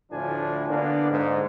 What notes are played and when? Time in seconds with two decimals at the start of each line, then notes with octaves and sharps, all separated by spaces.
0.11 D2 A2 F3 D4 G#5
0.69 D3 A#3 B3 D4 D5
1.11 G#2